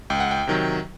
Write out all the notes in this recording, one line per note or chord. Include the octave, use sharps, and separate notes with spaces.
C#2 G5
F#5
G5
C3 D#3 F#3